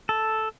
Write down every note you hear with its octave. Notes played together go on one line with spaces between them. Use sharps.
A4